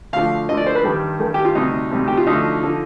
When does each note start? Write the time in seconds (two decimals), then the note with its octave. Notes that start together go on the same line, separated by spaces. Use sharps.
0.13 D2 D3 F3 F5
0.49 D2 D3 F3 D#5
0.57 D5
0.66 C5
0.75 B4
0.84 G2 D#3 G3
1.19 G2 D#3 G3
1.34 G4
1.45 F4
1.55 D2 C3 G3 D#4
1.91 D2 C3 G3
2.08 G4
2.17 F4
2.26 D2 D3 F3 D#4
2.63 D3 F3